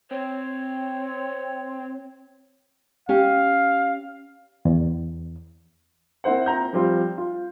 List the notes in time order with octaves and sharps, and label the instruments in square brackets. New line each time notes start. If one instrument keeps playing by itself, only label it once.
[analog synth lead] C4 [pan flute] C#5
[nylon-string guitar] C#4 G4 [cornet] F5
[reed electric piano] E2
[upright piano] A#3 C4 E4 C5 F#5
C4 F4 A#5 G6
F3 G3 C4 F4
F4